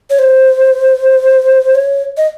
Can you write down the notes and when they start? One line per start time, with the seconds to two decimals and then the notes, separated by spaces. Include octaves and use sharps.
0.10 C#5
0.19 C5
1.75 C#5
2.17 D#5